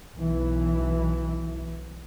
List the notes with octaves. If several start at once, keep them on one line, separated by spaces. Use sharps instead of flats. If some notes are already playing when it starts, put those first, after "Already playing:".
B1 E3